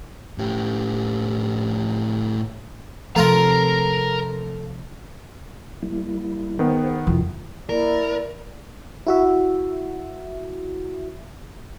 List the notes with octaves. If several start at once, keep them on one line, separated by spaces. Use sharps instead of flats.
A2 G4
C3 F3 A3 F4 A#4 A#5 C6
G3 A#3 E4
D#3 B3 G#4 C5
F2 C3 E4
A#3 E4 A#4 D5
E4 F#4 E5